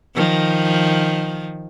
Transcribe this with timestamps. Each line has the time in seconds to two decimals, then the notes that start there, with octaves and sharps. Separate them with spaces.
0.15 D#3 F3